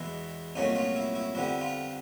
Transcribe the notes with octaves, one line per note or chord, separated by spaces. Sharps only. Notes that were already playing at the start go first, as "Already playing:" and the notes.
Already playing: E2 B2 G#3 E4
C2 A#2 F#3 A3 C#4 D#4
F4
E4
E4
F2 D3 G3 B3 E4
F4